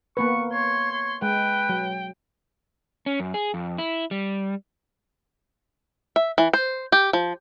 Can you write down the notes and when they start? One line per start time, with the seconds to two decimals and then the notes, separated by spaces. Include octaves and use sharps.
0.17 A#3 B3 B4 C#6
0.52 C#5 C6
0.92 C#5
1.22 G#3 B4 G5
1.69 F#3
3.06 C#4
3.20 F#2
3.34 G#4
3.54 F2
3.78 E4
4.11 G3
6.16 E5
6.38 E3
6.53 C5
6.92 G4
7.13 F3